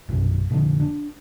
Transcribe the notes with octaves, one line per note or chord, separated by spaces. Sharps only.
A#1 F#2 B2
F1 A#2 D3 F3
D4